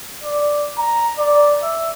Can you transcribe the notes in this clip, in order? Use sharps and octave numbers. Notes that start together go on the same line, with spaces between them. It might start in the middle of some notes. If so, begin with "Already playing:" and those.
D5
A#5
D5
E5